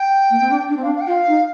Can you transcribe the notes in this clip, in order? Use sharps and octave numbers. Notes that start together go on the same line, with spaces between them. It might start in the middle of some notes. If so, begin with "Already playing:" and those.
Already playing: G5
A#3
C4
D4
D4
C4
D4 F5
F5
G5
F4 F5
D#4